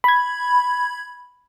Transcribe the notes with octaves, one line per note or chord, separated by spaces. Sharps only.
B5 G#6